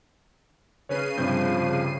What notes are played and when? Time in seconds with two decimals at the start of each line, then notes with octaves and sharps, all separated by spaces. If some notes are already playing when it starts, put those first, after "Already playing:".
0.89 C#3 C#4 B4 C#5 C7 D#7
1.18 G2 C3 F3 G6